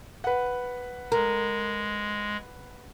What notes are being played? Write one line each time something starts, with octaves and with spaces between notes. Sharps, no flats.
B4 F#5
G#3 A#4